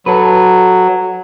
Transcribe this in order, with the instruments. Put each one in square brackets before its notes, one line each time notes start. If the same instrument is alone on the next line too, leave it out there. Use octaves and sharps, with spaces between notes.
[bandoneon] F#3 [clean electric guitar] A4 B4